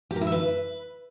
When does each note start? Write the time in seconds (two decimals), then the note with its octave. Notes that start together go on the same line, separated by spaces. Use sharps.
0.11 G4
0.16 A#4
0.21 E4
0.27 E5
0.32 B4